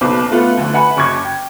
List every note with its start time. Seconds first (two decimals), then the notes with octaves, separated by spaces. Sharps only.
0.01 F#1 B1 B2 B4 C5 D6
0.31 A3 B3 F4 A4 B4
0.57 D2 D3 F#4
0.73 B4 E5 F#5 G#5 B5
0.97 F#1 F#2 C#6 D6 G#6
1.25 G5